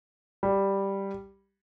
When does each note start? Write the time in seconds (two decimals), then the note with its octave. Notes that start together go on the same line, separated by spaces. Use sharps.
0.43 G3